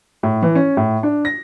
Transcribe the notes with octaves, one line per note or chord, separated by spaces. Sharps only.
A2
E3
C#4
A2
D4
A#6